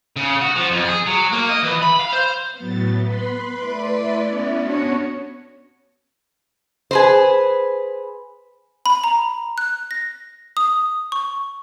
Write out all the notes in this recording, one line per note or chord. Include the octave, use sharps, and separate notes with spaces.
C#3
F#4
F3
F2
G#4
F#3
A#3
D#5
E3
B5
F5
C5
A2 F#3 B3 A6
B4 B5 C6
A3 E4 D5
B3 C#4
D4 F#4 C#5
G#4 B4 C5
B5
A#5
F#6
A#6
D#6
C#6